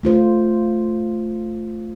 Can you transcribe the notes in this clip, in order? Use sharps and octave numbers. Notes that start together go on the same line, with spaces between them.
A3 F4 C5